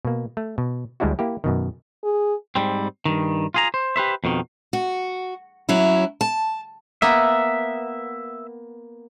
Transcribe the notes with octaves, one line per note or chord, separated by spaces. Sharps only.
B2 A#3
A3
B2
D2 G3 G#3 D4 E4 F#4
A#3 E4 G4
F#2 B2 D#3
G#4
G#2 G3 C4
G2 D#3
F4 G#4 A#5
C5
G4 B4 C5 E5
F2 B2 D#3
F#4
F#3 C#4 E4
A5
A#3 B3 E5